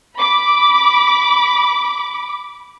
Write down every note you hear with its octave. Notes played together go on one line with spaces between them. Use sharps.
B5 D6